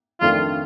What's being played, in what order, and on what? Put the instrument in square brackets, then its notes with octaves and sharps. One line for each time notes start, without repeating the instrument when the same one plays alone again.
[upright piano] F2 D#3 A3 D4 [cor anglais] F4